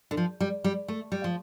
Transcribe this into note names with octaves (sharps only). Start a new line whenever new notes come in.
D3
F3
G3
G3
A3
G3
F3